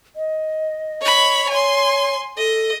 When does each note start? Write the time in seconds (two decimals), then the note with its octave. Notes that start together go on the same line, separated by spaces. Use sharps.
0.16 D#5
1.01 C#5 B5
1.50 C#5 G#5 C6
2.38 A4 D#5